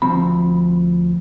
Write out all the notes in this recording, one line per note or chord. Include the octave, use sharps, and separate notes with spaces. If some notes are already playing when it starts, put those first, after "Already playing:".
D2 F3 C4 B5